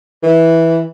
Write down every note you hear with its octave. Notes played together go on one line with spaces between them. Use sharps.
E3